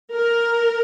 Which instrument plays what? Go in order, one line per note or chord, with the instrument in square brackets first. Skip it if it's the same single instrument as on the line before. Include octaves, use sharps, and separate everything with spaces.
[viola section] A#4